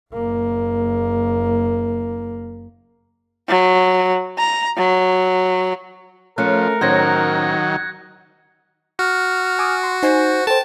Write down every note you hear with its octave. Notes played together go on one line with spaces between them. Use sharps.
F#1 A#3
F#3
A#5
F#3
F3 A3 C#4 A#4 F#6 C#7
A2 D#3 F#3 C#4 C5 G6 G#6 A#6
F#4 F6
G#5 D6 D#6
C6
D#4 C5 G#5
A4 C5 G5 A5